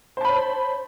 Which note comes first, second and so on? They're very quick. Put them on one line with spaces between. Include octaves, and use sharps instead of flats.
C5 A5 B5 C#5